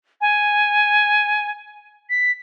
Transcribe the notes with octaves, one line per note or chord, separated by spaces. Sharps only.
G#5
B6